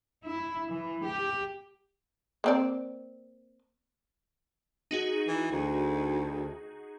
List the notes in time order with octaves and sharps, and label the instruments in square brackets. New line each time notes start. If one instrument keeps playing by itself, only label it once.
[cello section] E4
E3
G4
[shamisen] A#3 C4 D5
[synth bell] D#4 F#4 G#4
[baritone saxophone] E3
D2